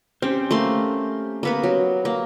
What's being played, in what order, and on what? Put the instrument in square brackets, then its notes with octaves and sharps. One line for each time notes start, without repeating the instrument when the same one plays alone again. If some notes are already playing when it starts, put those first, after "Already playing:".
[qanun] C4 [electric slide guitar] C#4 G4 C5
[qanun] A3 A#3 C6
A#3 B3 B5
F#3
A#3